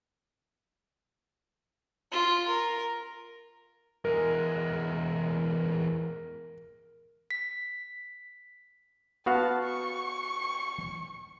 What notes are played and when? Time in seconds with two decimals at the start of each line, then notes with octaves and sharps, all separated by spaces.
2.12 F4
2.48 A#4
4.05 E2 G#3 A#4
7.31 B6
9.26 B3 F#4 F5 A5
9.64 C#6